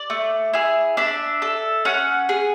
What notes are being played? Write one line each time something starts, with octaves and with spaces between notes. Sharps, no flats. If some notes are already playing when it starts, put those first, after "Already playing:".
Already playing: D5
A3
E4 G#4
D4 E5
A4
C#4 F#5
G#4